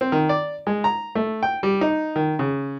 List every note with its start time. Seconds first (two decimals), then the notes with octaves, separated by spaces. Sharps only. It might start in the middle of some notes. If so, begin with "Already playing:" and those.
0.01 C4
0.12 D#3
0.29 D5
0.67 G#3
0.84 A#5
1.15 A3
1.43 G5
1.63 G3
1.81 D#4
2.16 D#3
2.39 C#3